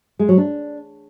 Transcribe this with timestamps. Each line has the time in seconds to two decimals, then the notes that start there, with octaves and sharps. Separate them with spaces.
0.19 G#3
0.29 F#3
0.38 D4